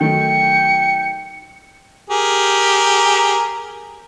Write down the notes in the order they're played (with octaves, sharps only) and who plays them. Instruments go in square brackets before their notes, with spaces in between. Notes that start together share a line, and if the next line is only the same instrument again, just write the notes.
[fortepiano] D#3 F#3 A3 [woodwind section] G5 [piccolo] C#7
[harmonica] G4 G#4 A#4